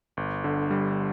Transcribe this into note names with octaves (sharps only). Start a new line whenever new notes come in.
G1
D3
G3